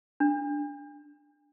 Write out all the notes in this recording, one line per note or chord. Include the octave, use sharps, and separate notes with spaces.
D4